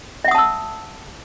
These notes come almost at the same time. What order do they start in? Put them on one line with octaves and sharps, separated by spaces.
E5 F#5 D#6 A5 E6